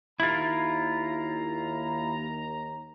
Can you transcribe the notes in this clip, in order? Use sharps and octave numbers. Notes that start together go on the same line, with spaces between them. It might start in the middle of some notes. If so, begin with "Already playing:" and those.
D#2 E4 F4 A#5